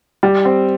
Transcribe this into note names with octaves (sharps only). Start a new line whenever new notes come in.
G3
C4